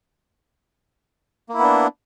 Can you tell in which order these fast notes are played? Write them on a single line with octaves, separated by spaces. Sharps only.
A#3 E4 B3 D4